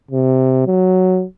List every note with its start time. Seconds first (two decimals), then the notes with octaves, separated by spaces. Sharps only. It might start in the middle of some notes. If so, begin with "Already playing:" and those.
0.11 C3
0.67 F#3